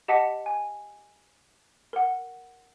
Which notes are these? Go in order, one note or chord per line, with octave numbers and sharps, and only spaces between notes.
G4 D#5 F#5 A5 B6 C#7
G#5
A#4 F#5